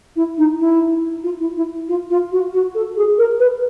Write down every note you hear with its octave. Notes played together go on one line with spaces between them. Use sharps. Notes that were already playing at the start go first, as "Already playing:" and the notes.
E4
D#4
E4
F4
E4
E4
F4
F4
F#4
F#4
A4
G#4
A#4
B4